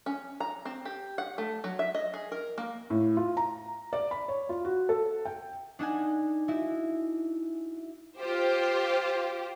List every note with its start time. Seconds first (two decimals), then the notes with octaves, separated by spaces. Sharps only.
0.06 C#4
0.40 A#5
0.65 C4
0.85 G4
1.18 F#5
1.38 A3
1.64 F#3
1.79 E5
1.95 D#5
2.14 G#4
2.32 A#4
2.58 A#3
2.90 A2
3.17 F4
3.37 A#5
3.93 D5
4.11 B5
4.28 C#5
4.49 F4
4.65 F#4
4.89 A4
5.25 G5
5.79 D4 D#4 F#5 G#5
6.48 D#4 E4 F#4
8.17 F4 G4 C5